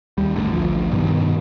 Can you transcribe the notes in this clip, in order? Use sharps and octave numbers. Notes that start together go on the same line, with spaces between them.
D#2 G3
G#1 A2 D3
A1 D2 F3
G2 B2 D#3